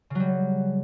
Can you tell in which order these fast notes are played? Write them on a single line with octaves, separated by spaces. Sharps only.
C#3 F#3 G3